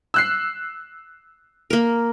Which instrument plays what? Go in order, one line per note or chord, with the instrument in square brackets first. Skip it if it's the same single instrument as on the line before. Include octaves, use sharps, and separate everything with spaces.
[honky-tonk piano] E6 F#6 C7
[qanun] A#3 A#4